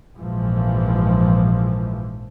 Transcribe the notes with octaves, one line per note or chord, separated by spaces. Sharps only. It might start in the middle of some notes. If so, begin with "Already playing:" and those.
A#1 G#2 E3 F3